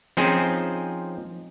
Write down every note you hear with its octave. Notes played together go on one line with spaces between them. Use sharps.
F3 C4 C#4 D#4 G#4 C5